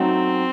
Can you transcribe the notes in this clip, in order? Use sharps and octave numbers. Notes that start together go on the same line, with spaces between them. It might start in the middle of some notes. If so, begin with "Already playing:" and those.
Already playing: F#3 A3 C4 D#4 A4